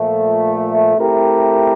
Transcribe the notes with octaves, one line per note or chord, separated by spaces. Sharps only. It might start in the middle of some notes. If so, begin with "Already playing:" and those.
Already playing: A#2 F3 A3
A3 C4 E4 G4 A#4